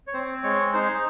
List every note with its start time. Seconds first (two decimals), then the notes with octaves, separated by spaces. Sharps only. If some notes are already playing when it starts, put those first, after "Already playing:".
0.07 C#5
0.13 C4 C5
0.43 G#3 C#5
0.73 D#4 C5